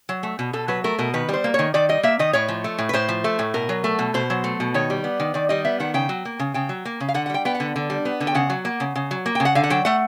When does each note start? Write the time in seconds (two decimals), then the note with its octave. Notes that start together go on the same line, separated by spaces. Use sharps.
0.09 F#3
0.23 A3
0.39 B2
0.53 B2 A4
0.68 F#3 B4
0.84 A3 A#4
0.99 B2 A#4
1.14 D#3 B4
1.29 G3 C5
1.44 A#3
1.54 D#3 C#5
1.74 D#3 D5
1.89 G3 D#5
2.03 A#3 E5
2.19 D#3 D#5
2.33 A2 C#5
2.48 F3
2.64 A3
2.78 A2
2.89 B4
2.94 A2 C5
3.09 F3
3.24 A3
3.39 A2
3.54 B2 A#4
3.69 F#3
3.84 A3
3.99 B2
4.14 B2 C5
4.30 F#3
4.44 A3
4.60 B2
4.74 D#3 C#5
4.90 G3
5.04 B3
5.20 D#3
5.34 D#3 D5
5.49 G3 D#5
5.65 B3 E5
5.80 D#3 F#5
5.94 C#3 G5
6.09 F#3
6.25 A#3
6.39 C#3
6.54 C#3 G5
6.69 F#3
6.85 A#3
7.00 C#3
7.09 F5
7.14 D3 F#5
7.26 F#5
7.30 G3 G5
7.45 B3 G5
7.55 F#5
7.60 D3
7.76 D3
7.90 G3
8.05 B3
8.20 D3
8.27 G5
8.35 C#3 F#5
8.50 F#3
8.65 A#3
8.80 C#3
8.96 C#3
9.11 F#3
9.26 A#3
9.35 G5
9.40 C#3
9.45 F#5
9.55 D3 F5
9.64 F#5
9.70 F#3 G5
9.85 A3 F#5